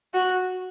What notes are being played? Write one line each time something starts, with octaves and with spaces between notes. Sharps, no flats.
F#4